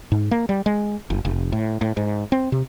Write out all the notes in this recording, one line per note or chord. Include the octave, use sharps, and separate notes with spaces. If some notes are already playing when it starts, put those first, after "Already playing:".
G#2
A#3
G3
G#3
F#1
F1
A2
A2
G#2
C4
C3